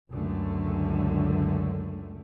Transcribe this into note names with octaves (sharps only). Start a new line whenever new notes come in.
C#2 F#2 D3 A3